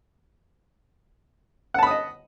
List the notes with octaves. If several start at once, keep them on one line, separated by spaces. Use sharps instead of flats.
D#5 F#5 A5 B5 D#6